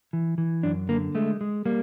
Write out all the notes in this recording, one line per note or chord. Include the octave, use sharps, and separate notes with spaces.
E3
E3
F#2 D4
D3 A#3
G#3 A3
G#3
G3 A#3